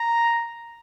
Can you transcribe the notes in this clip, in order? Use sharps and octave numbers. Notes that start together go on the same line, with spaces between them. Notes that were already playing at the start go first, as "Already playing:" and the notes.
Already playing: A#5